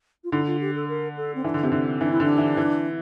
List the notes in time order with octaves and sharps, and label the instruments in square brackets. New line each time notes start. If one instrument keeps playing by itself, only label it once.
[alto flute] F4
[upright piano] D3 [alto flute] E4
[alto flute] F4
G4
A4
A#4
A4
C4
[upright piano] E3 [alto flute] D4
[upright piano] D3
C3
D3
[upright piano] E3 [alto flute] D4
[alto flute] E4
[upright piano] D3 [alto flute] D4
[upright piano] E3
E3